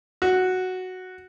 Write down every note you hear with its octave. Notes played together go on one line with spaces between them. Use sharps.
F#4